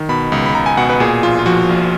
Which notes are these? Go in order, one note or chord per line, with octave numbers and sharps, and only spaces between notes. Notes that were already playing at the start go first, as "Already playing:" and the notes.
Already playing: D#3
B2 B5
C#2
B5
C#2 A#5
G#5
B2 F#5
B4
A#2 G#4
A#1 F4
F4
F3 F#4
A#1